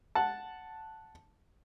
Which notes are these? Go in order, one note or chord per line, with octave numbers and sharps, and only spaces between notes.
F#5 A5